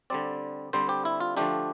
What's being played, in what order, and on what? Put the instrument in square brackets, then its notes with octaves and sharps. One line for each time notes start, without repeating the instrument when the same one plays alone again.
[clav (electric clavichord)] D3 G3 C4 D5
D3 G3 C4 C5
G4
E4
F4
D3 F3 A3 D4 G4